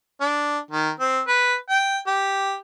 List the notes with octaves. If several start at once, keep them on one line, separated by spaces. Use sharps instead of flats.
D4
D#3
C4
B4
G5
G4